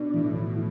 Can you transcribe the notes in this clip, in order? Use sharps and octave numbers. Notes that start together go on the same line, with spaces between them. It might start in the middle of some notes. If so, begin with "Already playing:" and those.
Already playing: B2 D4
A2 E3
E3